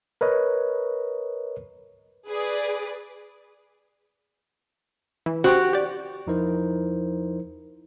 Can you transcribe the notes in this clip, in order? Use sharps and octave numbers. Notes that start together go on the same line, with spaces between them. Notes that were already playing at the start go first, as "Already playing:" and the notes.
A#4 B4 C#5 D#5
G#4 B4 D5
E3
F#4 G4 C5
G4 D5
E2 F3 D#4 E4 A#4 C5